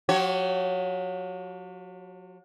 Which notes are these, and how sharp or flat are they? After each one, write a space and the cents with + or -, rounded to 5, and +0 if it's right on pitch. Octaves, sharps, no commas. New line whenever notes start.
F#3 -45 F#4 +45 C#5 +0